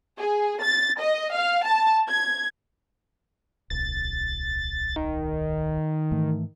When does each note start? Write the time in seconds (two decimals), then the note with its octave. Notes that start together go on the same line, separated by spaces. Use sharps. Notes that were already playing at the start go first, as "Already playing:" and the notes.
0.19 G#4
0.62 A6
1.01 D#5
1.34 F5
1.66 A5
2.08 G#6
3.70 D1 B1 A6
4.96 D#3
6.12 G#2 E3 A3